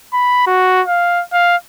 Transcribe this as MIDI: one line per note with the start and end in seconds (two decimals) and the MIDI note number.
0.14 0.45 83
0.47 0.82 66
0.87 1.23 77
1.33 1.56 77